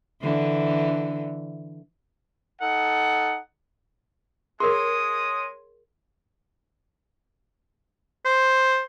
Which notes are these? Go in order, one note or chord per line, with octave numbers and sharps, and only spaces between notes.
D3 E3
D#4 A4 F#5
G#3 G#4 A#4 C#5 C6 D#6
C5